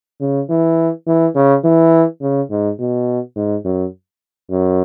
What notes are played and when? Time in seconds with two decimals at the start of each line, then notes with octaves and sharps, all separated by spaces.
0.20 C#3
0.50 E3
1.07 E3
1.35 C#3
1.64 E3
2.21 C#3
2.50 G#2
2.79 B2
3.36 G#2
3.65 F#2
4.50 F#2